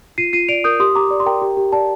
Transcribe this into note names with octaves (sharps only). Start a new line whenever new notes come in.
F4 C7 D#7
F4 C7 D#7
D5 D7 F7
A#4 D#6 G6
G4 C6 D#6
G4 A#5 D6
D5
C6
A#4 G5 A#5
G4
G4
D5 A5